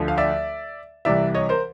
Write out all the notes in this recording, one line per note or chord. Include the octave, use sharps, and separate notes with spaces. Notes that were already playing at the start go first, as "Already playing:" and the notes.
Already playing: D2 D3 F3 A3
F5
D5 E5
C2 C3 E3 D5 E5
C#5 D#5
A#4 C5